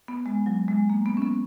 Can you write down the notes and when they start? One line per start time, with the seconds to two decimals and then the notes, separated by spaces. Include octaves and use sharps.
0.08 B3
0.26 G#3
0.46 F#3
0.68 G#3
0.90 A#3
1.06 B3
1.17 C#4
1.22 B3